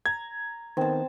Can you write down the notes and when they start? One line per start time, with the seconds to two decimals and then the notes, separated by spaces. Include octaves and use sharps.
0.06 A#5 G#6
0.77 D#3 B3 C4 A5